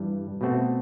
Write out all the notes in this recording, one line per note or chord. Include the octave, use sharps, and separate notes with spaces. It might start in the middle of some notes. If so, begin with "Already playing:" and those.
Already playing: G2 E3 G3
B2 A3 C4 F#4